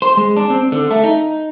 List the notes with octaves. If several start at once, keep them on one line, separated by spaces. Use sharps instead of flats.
C5
G#3
D4
C4
D3
A3
D#4